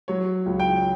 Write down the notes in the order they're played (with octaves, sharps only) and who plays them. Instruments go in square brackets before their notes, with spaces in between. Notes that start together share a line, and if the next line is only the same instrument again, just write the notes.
[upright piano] F#3 C#5
C#2
G5